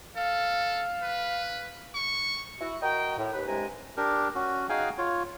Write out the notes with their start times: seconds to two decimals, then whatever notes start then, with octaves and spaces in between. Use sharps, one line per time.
0.16 A4 F5
1.02 B4
1.95 C#6
2.61 E4 F#4
2.82 F#4 A#4 D#5 G5
3.17 A2
3.33 D#2 B4
3.47 C2 G2 C3 G#3 G#5 A#5
3.97 D4 G4 A#4
4.35 C#4 F#4
4.69 D#4 F#4 G#4 F5 G5 G#5
4.98 F4 C#5